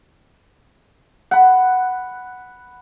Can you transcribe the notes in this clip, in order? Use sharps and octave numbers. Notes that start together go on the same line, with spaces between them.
F#5 B5